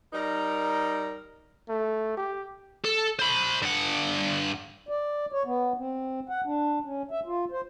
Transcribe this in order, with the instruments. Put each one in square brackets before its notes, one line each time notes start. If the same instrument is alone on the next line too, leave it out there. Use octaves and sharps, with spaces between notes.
[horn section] G3 D#4 A#4 A#5
[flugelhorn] A3
G4
[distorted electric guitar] A4
C5 B5
G2 F#5
[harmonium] D5
C#5
B3
C4
F#5
D4
C#4
E5
F4
C5